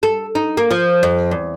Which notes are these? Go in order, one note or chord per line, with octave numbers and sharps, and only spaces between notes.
A4
D#4
A#3
F3
F2
E2